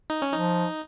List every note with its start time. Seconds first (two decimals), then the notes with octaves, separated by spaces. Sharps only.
0.10 D#4
0.22 C#4
0.33 F3 D#4